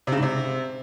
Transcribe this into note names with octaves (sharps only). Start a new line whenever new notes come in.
C3
C#3
G#2
C3